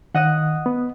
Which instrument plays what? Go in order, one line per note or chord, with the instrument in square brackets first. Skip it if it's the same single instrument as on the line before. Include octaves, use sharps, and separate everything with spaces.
[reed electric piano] D#3 F#6 [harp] D#5 F#5
[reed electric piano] B3